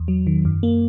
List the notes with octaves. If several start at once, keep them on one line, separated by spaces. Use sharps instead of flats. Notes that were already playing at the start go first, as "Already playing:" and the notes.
Already playing: E2
F#3
D#3
F#2
A#3